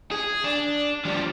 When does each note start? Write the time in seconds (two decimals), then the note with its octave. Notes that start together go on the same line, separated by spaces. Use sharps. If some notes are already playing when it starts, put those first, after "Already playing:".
0.11 G#4
0.44 D4
1.05 F3 G3